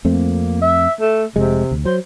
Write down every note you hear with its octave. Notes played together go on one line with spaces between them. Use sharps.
F2 A3 A#3 C4
E5
A3
F1 C3 G#3
D2
F#3 C5